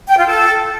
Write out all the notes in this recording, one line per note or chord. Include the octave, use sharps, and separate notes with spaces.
G5
F4
A4